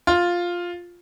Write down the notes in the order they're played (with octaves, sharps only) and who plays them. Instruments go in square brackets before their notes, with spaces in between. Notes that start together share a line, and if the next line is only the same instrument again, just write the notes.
[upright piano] F4